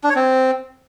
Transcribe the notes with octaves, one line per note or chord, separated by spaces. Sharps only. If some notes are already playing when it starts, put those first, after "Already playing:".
D4
C#5
C4